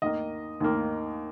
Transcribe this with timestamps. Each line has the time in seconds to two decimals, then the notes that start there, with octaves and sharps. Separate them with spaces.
0.02 D#2 D#3 A#3 D#5
0.60 D#2 D#3 A#3